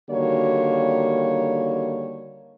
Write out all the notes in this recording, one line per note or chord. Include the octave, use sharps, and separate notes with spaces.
D3 D#3 G3 A#3 F#4 C#5